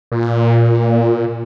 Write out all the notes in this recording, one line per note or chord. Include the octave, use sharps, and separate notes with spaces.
A#2